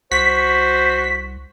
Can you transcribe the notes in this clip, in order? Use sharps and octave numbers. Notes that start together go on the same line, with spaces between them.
C2 F#4 C5 B6